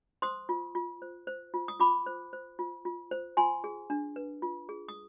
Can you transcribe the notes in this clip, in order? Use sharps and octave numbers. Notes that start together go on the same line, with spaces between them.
C5 C6 D#6
F4
F4
C5
C5
F4
D#6
F4 B5 D6
C5
C5
F4
F4
C5
F4 G#5 C6
G#4
D4
B4
F4
G#4
D#6